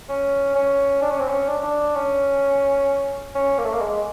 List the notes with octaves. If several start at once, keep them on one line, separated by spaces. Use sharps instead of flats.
C#4
C#4
D4
C#4
C4
C#4
D4
D4
C#4
C#4
A#3
A3
A#3
G#3